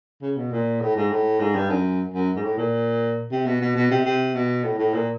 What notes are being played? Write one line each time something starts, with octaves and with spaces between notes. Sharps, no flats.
C#3
B2
A#2
A2
G#2
A2
G#2
G2
F#2
F#2
G#2
A2
A#2
C3
B2
B2
B2
C3
C3
B2
A2
A2
A#2